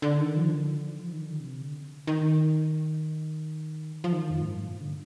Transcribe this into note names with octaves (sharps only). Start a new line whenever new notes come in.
D3
D#3
F3
D3
F3
D#3
D3
C3
D3
D#3
F3
D#3
F2
A2
G2
A#2
D3